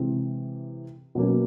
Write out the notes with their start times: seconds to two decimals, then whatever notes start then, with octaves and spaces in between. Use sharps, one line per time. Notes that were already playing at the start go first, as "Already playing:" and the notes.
Already playing: C3 E3 G#3 C4
1.15 B2 F#3 A#3 C#4